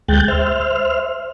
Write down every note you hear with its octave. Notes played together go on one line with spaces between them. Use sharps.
D2 G#3 G5 F#6 G6 A6
C5 E5 F6